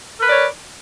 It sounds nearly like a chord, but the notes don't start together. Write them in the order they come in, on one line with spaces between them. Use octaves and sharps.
A#4 B4 D5 C#5